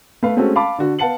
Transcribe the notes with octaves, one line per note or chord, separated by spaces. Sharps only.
A3 B4 F5
G#3 A3 C4 C#4 F#4 A4
F5 A5 B5 D6
D3 F#4
B3 F5 F#5 A5 C#7 F#7